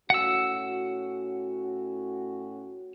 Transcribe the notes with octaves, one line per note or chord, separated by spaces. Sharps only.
A2 C#4 F#4 F#5 E6